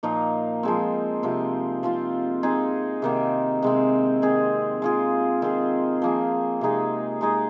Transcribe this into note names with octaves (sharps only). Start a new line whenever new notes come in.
A#2 F3 A#3 D#4
F3 G#3 C4
C3 F3 C4
F3 C4 F4
G#3 C4 D#4 G#4
C3 D#3 A#3
C3 G#3 C4
D#3 C4 G#4
G#3 F4 G#4
D#3 C4 F4 G#4
F3 A#3 G#4
C3 G#3 D#4 G#4
G#3 D#4 G#4